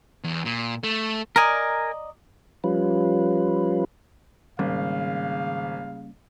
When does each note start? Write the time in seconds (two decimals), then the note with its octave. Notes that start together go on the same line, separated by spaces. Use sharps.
0.24 E2
0.45 A#2
0.83 A3
1.36 A#4 D5 D#5 G#5 A#5
2.64 F3 G3 C#4 F4 B4
4.59 G#1 C#3 G3 A#3 C#4 F5